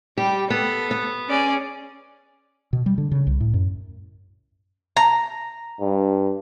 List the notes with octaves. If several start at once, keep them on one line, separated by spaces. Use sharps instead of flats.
G3 G4
B3 A4
B3
C#4 G#4 D5
B2
G3
D3
C#3
C2
A2
F#2
A#5
G2